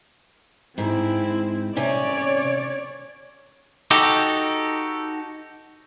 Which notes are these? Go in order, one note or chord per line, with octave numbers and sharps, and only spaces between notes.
G#2 C4 E4
C3 C#4 C#5 D5 G#5
D#4 F#4 G4 A4